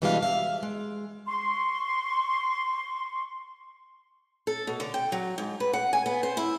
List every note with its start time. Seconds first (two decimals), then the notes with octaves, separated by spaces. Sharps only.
0.02 B2 E3 G3 G#3 D4 F5
0.22 E5 F5
0.63 G#3
1.26 C6 C#6
4.47 A4
4.67 B2
4.80 D3
4.94 G5
5.12 F#3
5.38 G#2
5.60 B4
5.73 F#5
5.93 G#5
6.06 B3
6.23 C5
6.37 E4